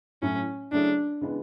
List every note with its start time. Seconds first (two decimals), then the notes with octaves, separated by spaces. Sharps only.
0.22 A2 F#3 A3 C#4
0.72 C#3 F#3 A3 D4 E4 G#4
1.21 C#3 E3 G#3 B3 D4